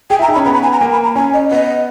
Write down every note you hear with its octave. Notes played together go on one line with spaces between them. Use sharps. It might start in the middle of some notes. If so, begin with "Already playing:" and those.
G#4 G5
E4
A#5
D#4
B5
C#4
B3 A#5
B5
G#5
A#5
A#3 G#5
B5
A#5
C#4 G#5
D#5
B3 D#5